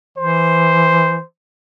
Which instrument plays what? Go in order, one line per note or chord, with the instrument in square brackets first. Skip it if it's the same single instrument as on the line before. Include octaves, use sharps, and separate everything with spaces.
[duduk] E3 [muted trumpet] C5